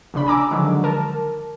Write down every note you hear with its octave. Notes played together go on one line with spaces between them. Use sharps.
A#1 C#3 D4 B5
G#5 A#5 D6 E6
D3 D#3 F3 F#3 G#3
A#4 A5